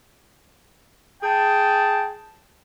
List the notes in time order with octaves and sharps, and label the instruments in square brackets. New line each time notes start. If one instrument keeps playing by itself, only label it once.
[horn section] G#4 G5 A5